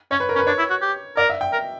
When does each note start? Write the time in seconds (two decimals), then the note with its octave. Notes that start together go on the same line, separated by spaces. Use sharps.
0.11 C#4 C#5
0.20 B4
0.29 A#4
0.35 C#4
0.38 B4
0.47 D4 C#5
0.58 E4
0.70 F#4
0.82 G4
1.17 A#4 D5
1.29 E5
1.41 G5
1.53 A#4